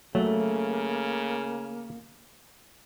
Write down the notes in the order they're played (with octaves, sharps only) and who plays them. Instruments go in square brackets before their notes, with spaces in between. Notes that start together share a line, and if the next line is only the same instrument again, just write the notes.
[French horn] C#3 [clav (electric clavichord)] F#3 [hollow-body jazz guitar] A3 [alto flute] A#3